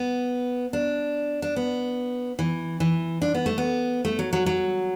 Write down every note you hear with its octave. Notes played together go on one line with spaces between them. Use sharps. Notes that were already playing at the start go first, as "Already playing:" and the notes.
Already playing: B3
D4
D4
B3
E3
E3
D4
B3
A3
B3
A3
F#3
F#3
F#3